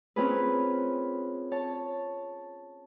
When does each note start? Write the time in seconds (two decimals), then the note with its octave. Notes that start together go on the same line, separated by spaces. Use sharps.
0.16 C4 C#4 F4 G#4 A#4 B4
1.52 C#5 A5